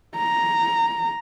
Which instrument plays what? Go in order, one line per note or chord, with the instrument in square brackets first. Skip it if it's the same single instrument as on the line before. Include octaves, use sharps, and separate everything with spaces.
[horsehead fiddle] A#5